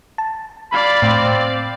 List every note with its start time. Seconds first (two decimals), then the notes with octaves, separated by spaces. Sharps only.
0.18 A5
0.72 D5 F5 B5
1.02 A2 C4